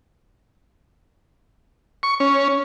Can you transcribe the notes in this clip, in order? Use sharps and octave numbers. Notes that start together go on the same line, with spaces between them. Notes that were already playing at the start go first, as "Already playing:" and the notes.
C#6
C#4